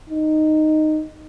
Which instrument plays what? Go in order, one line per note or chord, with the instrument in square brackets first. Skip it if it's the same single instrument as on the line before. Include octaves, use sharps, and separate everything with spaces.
[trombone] D#4